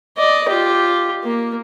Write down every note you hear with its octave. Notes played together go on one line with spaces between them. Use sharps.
D5 D#5
F4 G4
A#3